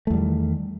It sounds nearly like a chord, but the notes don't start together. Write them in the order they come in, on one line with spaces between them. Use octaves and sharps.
A3 E2 G3 D#3